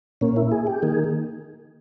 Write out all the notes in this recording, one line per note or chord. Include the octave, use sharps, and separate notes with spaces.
A#2 A#3 C#4
E4
G#4
G4
D#3 A#3 G#4